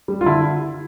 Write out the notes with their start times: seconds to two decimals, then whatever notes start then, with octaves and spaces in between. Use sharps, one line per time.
0.08 G3
0.21 F4
0.26 D3 E4